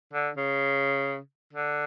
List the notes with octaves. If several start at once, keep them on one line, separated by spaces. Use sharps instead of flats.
D3
C#3
D3